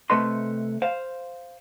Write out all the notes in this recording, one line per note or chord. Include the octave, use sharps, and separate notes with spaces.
C3 E3 A3 B4 D#5 C6
C5 F5